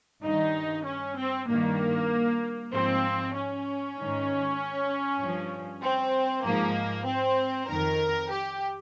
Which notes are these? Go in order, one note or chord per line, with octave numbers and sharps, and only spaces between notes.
G2 D#3 D#4
C#4
C4
G2 D#3 A#3
G#2 F3 C4
C#4
G#2 D#3
G2 F3
C4
G#2 F3 A#3
C4
F2 D#3 A#4
G4